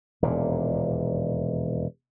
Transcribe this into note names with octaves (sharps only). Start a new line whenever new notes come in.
E1 D#2 A#2